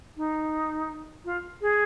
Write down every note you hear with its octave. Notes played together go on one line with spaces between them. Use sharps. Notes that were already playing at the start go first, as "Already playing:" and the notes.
D#4
F4
G#4